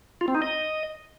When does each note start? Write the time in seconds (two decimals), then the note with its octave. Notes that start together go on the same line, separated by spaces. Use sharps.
0.21 F4
0.28 C4
0.35 D#4
0.42 D#5